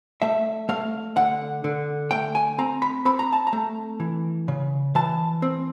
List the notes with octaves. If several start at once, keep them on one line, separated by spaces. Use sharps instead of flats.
A3 E5
A3 F5
D3 F#5
D3
A3 G5
G#5
C4 A#5
B5
C4 B5
A#5
A5
A#5
A3
E3
C#3
E3 A5
C4